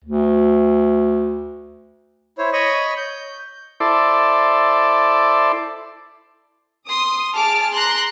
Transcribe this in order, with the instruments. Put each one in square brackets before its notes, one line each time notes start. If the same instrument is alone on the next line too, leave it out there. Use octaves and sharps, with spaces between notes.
[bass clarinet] D2
[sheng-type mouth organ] E4 C5 C#5
C#5 D#5 B5 C#6 D#6
G6
[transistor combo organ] E4 A4 C5 D5
[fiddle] C6 [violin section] D#6
[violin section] G#4 A5 F6 [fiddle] D6
[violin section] A#5 C6 [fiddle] F#6